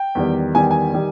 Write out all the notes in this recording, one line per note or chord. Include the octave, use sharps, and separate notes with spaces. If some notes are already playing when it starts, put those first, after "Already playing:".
Already playing: G5
E2 D#3 G3
E2 D#3 G3 G#5
G#5
D#3 G3